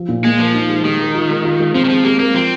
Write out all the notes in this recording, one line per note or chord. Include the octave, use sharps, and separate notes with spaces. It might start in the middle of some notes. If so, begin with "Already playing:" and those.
Already playing: F3
A#2
G#3 A#3
F3 A#4
D#4
G#3
D#3 G#3
A#4
F4
G#3
F4
G#3
F3 C4
D#3
F3 G#4
G#3 A#3
A#3 A#4
F3 C4